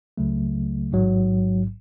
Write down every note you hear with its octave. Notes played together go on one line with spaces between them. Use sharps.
C#2 C#3 F#3 A3
A1 G#2 F#3